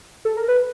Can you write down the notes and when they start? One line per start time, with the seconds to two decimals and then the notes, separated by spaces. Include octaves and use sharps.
0.25 A4
0.37 A#4
0.48 B4